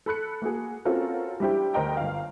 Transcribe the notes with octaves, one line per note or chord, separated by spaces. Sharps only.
A4 B5 F#6 C#7
A#3 F#4 G#4
C4 C#4 F4 F#4 A4 A#4
G3 D4 E4 G4 C5 G5
D2 A#4 C5 D#5 G5 A#5
G1 F5